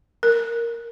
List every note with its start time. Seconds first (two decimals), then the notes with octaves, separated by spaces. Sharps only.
0.23 A#4